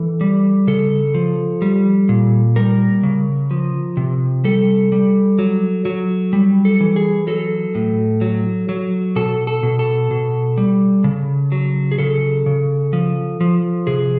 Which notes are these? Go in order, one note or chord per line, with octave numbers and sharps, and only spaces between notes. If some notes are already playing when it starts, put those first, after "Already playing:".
Already playing: E3 A4
G3
C#3 A4
F3
G3
A#2
G3 A#4
C#3
F3
C3
G3 A4
G3
F#3
F#3
G3
A4
E3
G#4
F#3 A4
A2
F#3
F#3
B2 A4
A4
B2
A4
B2
G3
C#3
F#3
G#4
C#3 A4
C#3
F3
F3
C3 G#4